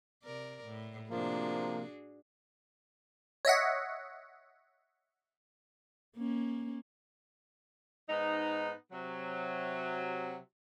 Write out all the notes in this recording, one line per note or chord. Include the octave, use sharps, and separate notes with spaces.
C3 A#4 D5
A2
C3 F3 A#3 D4 F#4 G#4
C#5 D#5 E5 F#5
A#3 C#4
G#2 B3 D#4
C3 F#3